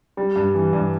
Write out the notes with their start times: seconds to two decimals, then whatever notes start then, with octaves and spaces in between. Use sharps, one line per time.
0.17 G3
0.36 G2
0.54 E3
0.73 G2